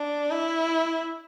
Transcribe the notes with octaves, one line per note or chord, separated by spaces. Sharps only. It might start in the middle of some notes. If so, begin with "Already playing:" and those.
Already playing: D4
E4